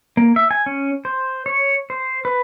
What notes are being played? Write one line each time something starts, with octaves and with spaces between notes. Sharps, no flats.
A#3
E5
G#5
C#4
C5
C#5
C5
B4